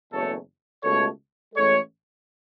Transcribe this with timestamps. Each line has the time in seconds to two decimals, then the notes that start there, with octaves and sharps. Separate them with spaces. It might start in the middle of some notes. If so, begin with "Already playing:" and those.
0.12 F#1 E2 B2 A3 A4 C#5
0.83 C#2 B2 A3 A4 C#5
1.55 A1 A2 G#3 A4 C#5